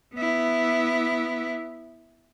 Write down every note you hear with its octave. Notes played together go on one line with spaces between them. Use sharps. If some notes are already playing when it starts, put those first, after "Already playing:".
B3 E4